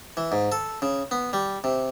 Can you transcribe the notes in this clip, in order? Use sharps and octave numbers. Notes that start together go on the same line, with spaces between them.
E3
G#2
A4
C#3
B3
G3
C3